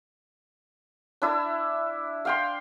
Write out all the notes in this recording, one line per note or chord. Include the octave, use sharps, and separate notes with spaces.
D4 E4 E6
F5 G5 C6